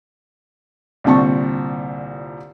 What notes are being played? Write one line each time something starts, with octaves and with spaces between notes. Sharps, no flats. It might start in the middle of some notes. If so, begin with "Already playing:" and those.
C2 A#2 D3 C4 A5 C#6